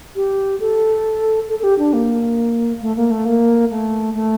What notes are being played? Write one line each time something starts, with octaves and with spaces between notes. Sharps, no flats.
G4
A4
A4
A4
G4
D4
A#3
A3
A#3
A3
A#3
A3
A3